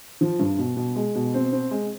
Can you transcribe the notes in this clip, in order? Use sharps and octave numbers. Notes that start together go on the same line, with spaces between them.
F3
G2
B2
B2
G#3
B2
C4
C4
G#3